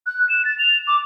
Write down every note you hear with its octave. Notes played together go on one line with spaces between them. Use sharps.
F#6
E7
A6
F7
D6